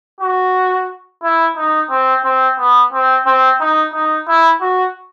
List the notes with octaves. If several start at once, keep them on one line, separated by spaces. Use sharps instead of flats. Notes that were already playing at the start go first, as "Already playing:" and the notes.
F#4
E4
D#4
C4
C4
B3
C4
C4
D#4
D#4
E4
F#4